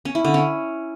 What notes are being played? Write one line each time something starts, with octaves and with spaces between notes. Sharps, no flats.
C#4
E4
D3
C#4